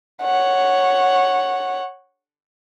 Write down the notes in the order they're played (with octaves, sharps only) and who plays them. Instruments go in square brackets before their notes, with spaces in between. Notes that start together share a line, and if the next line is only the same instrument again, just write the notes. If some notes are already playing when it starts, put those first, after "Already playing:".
[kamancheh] C#5 F#5